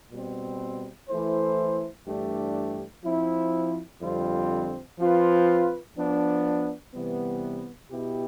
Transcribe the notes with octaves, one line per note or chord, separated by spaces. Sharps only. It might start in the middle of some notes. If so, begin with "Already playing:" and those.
B2 G3 C4
E3 A3 E4 A4 C5
G2 E3 A3 D4 G4
F3 C4 E4
F2 D3 G3 C4 F4
F3 C4 F4 B4
F3 B3 D4
C3 E3 G3 B3
B2 B3 E4 G4